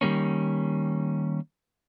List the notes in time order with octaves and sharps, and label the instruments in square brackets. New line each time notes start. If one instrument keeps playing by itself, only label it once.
[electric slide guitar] D#3 G3 A#3 C#4